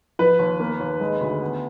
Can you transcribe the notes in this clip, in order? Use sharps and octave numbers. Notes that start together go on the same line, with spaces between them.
F3 B4
D#2
A#3
D#2
G#3
D2
B3